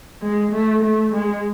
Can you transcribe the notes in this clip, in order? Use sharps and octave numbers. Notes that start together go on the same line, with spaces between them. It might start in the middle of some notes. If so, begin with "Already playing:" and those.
G#3
A3
A3
G#3